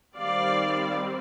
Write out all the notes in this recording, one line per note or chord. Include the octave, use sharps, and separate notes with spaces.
D#3 G3 C4 D5 F5